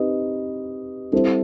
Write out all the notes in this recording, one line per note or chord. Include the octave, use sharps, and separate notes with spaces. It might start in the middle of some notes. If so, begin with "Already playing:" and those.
Already playing: C4 D#4 G4 B4 D#5
G3 C4 E4 A4 C5